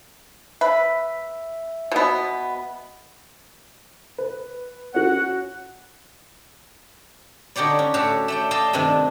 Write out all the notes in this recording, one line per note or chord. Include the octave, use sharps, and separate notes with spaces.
B4 E5
B2 B3
B4
C#4 F#4 F#5
D3 D#4 G4 C#5 D5
C#4
A2 F#4 G4 A4 C#5
A3 D5 G5
D5 D#5 F5 G5 A5
G2 C3 D#3 D4 D5